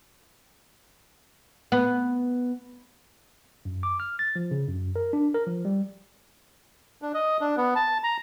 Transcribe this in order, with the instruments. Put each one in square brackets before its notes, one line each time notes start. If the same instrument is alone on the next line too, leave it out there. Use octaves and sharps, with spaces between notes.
[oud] B3
[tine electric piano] F#2
D6
F6
A6
F3
C#3
F#2
A#4
D4
A#4
F3
G3
[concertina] D4
D#5
D4
B3
A5
A#5